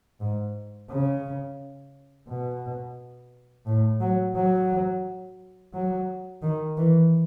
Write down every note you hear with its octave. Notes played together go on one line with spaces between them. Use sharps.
G#2
C#3
B2
A2
F#3
F#3
F#3
D#3
E3